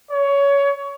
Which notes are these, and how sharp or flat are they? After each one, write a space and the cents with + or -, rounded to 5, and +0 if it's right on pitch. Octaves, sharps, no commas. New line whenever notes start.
C#5 +20